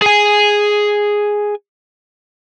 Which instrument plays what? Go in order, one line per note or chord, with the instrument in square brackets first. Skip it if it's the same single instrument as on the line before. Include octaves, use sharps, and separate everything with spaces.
[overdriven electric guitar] G#4 G#5